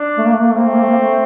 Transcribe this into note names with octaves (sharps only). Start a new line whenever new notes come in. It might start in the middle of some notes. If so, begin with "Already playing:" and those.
Already playing: D4
A3
A#3
A3
A#3
A3
A#3 C4
A3
A#3
A3
A#3
A3